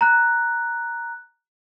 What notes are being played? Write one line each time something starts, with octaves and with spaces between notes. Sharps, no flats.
A#5 F#6